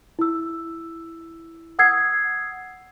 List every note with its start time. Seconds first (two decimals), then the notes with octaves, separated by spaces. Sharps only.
0.19 E4 E6
1.79 F#5 D#6 E6 G#6 C7